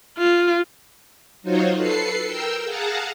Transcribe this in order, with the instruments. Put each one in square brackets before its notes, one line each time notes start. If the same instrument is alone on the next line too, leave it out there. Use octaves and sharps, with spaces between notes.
[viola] F4
[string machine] F#3 D#4 F4 F#4 C5 C#5
A4 B4 C7 C#7
A#4 G5 E6
G#4 F5 F#5 A5 A#5